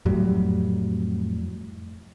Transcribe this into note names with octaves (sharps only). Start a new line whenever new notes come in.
F2 A2 F#3 G3